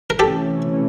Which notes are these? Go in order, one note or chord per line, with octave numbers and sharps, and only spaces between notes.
A#4
C3 E3 A3 C#4 G4 A4